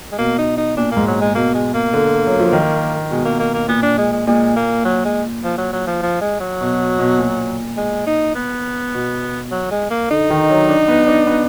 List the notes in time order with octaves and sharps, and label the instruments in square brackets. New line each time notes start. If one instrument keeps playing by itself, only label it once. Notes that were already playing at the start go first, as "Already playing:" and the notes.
[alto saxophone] G#3
[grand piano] B2 [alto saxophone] A#3
[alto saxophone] D#4
D#4
[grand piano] A#2 [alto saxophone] D4
[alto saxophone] A#3
[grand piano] G#2
[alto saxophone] F#3
G#3
[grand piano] B2 [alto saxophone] A#3
[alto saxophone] G#3
A#3
[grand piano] D3
F#3
F3
D#3
[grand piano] B2 [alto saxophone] G#3
[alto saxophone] A#3
A#3
A#3
[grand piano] A#2 [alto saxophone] B3
[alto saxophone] D4
G#3
G#3
[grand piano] A#2 [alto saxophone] G#3
[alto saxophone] A#3
F#3
G#3
F3
F#3
F#3
F3
F3
G#3
F#3
[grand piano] B2
B2
A#2
[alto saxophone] G#3
D#4
B3
[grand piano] B2
[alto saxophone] F#3
G#3
A#3
[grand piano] D3 [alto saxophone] D#4
[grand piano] D#3
F#3
D4
B3
D4
B3